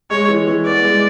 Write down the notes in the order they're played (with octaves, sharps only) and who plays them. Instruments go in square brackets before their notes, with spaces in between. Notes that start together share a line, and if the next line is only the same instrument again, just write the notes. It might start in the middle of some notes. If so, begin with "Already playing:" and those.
[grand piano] G#3 [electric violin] C#5
[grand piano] E3
E3
[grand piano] B3 [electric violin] D5
[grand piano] G#3